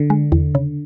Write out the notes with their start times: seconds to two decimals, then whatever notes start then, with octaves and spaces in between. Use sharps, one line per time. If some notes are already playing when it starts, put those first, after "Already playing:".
Already playing: D3
0.10 G#3
0.32 E2
0.55 C#3